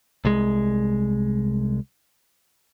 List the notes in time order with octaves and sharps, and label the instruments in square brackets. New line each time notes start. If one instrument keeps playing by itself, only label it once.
[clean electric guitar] C2 G#3